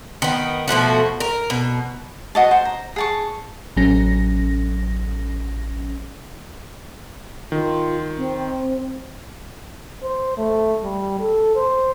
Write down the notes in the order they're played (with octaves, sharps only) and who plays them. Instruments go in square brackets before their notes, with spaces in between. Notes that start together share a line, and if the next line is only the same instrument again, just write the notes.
[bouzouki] D#3 B3
B2 F3 A3 F#4
A#4
B2
[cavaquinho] F#4 D#5 A5
C5
A#5
G#4 A5 C#6
[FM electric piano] A1 F#3 C#4 A#6
[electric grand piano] D#3 [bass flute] F4
[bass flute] C4
[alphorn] C5
A3
G3
A4
C5